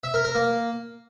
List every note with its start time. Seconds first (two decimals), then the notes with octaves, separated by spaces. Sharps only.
0.03 E5
0.14 A#4
0.24 A#4
0.35 A#3